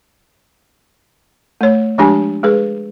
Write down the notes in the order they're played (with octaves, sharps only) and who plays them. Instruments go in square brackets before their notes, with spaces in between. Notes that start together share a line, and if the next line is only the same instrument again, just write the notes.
[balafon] A3 C#5
F3 G#3 D4 G4 G#5 A5
G#3 G#4 B4